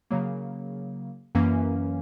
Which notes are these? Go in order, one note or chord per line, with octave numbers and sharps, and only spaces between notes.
C#3 F#3 A#3
F#2 E3 A#3 C#4